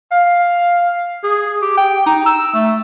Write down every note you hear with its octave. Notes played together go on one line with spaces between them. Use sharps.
F5
G#4
G4
G5
D#4
E6
A3